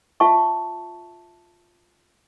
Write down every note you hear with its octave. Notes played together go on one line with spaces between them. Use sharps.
F4 E5 A5 C#6